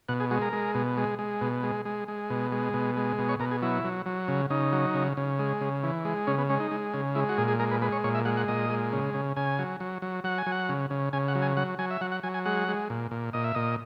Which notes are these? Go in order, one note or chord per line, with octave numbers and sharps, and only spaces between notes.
B2 F#5
G#4
G#3 F#4
A#4
G#3
B2
G#3
G#3
B2
G#3
G#3
G#3
B2
G#3
B2
G#3
B2
C#5
B2 A#4
G#4
F#3 E4
F#3
F#3
C#3
C#3 D#4
F#3
C#3
C#3
G#3
C#3
E3
G#3
C#3 C#4
B3
G#3 C#4
D#4
G#3
C#3
G#3 E4
F#4
A#2 G#4
G#4
G#3 A#4
B4
G#3 B4
C#5
A#2 C#5
E5
G#3 F#5
F#5
A#2 D#5
G#3
C#3
C#3
C#3 G#5
F#3
F#3
F#3
F#3 F#5
G#5
F#3
F#5
C#3
C#3
C#3 G#5
F#5
F#3
G#5
F#3 F#5
F#3 G#5
E5
F#3 F#5
F#5
F#3 G#5
G#5
G#3 F#5
G#3
A#2
A#2
A#2 D#5
E5
A#2 D#5